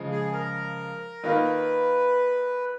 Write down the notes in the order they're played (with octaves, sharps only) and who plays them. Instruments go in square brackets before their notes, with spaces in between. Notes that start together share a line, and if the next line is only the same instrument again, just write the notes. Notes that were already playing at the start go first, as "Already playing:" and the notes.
Already playing: [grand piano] C#3 F3 G#3
[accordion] G#4
A#4
[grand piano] D#3 A#3 F4 [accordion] B4